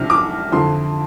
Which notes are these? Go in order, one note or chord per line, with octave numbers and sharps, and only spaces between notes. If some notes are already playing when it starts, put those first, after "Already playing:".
Already playing: C2 C3 F3 D4 F6
D6
F2 D3 F3 C6